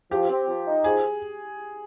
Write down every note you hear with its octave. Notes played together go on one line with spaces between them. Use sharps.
F3 G4
C4
F3
D#4
F3 G#4